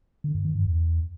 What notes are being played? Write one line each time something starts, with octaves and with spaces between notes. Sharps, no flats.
D3
F#2
D#3
G2
E2